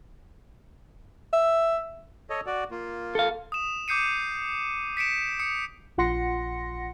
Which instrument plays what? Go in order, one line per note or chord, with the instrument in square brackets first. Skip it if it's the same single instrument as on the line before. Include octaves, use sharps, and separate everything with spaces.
[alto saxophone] E5
[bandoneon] A4 C#5 D#5
F#4 D5
A#3 F4
[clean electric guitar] A4 F5
[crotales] D#6 E7
D6 D#6 G6 C7 C#7 D#7
B6 C#7 D7 E7
D#6 C#7
[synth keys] A#1 F4 F#5 C6 A#6 C#7